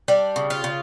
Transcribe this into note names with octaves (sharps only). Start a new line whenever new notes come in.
G3 D4
C#3
F4
C#3